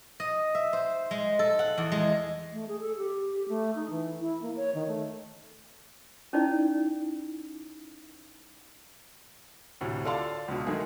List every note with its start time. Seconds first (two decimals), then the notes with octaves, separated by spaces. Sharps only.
0.20 D#5
0.55 E5
0.73 C5
1.11 G#3
1.39 A4
1.59 F#5
1.78 E2
1.92 G#3
2.52 A3
2.68 G#4
2.80 A4
2.97 G4
3.49 A3
3.75 D#4
3.90 E3
4.21 E4
4.42 A#3
4.56 C#5
4.75 D#3
4.88 A3
6.33 C#4 D#4 E4 D5
9.81 D2 A2 C3
10.04 F4 A4 D5 F5 A5 C6
10.48 C#2 B2
10.67 D#3 G#3 A3 G#4